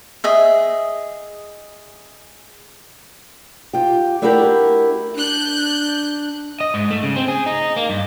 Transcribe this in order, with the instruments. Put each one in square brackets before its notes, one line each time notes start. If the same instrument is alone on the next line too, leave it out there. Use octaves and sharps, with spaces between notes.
[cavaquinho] G#4 D#5 E5
[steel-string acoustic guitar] F4 G4
A3 D4 E4 F#4 G4 A#4
[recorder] D4 [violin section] F#6 G6
[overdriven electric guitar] D#5
G#2
A3
C#3
C4
G#4
D#4
A#3
G2